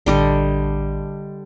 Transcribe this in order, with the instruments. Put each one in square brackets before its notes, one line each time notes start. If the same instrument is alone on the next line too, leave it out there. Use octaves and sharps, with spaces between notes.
[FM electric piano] A1 [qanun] D3 G3 D#5